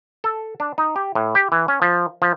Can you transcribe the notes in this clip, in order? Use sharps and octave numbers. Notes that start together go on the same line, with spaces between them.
A4
D4
D#4
G4
A2
G4
E3
C#4
F3
F3